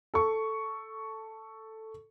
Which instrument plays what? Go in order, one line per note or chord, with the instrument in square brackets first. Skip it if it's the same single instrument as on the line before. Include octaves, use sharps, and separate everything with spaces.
[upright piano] A4 C#6